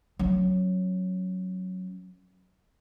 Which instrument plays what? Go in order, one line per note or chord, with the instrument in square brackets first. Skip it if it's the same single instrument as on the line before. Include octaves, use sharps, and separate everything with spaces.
[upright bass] F#3 C#4